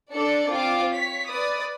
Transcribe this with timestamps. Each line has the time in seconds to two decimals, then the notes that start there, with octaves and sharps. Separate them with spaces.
0.11 D4 A4 D5 C#7
0.49 C4 F4 D6
0.90 C#5 B6
1.29 B4 D5 D#6